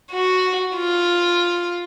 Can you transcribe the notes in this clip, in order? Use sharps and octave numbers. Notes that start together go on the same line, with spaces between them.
F#4
F4